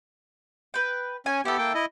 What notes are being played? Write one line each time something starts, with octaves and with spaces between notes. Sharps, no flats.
B4 G5
C#4 G#5
B3 E4 G4 A4
A#3 G5
E4 D#5